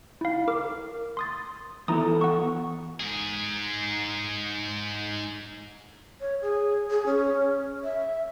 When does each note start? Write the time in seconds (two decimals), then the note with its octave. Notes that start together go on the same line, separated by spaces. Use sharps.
0.21 E4 F5
0.48 A#4 D6
1.17 C6 D#6 A6
1.88 E3 B3 E4 A4 A#5 D#6
2.21 F#5 C#6
3.00 G#2 G#4
6.21 C#5
6.42 G#4
6.90 G#4
7.06 C#4
7.84 E5